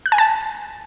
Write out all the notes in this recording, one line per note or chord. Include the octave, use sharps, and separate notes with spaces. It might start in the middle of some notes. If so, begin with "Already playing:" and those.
F#6
G#5
A5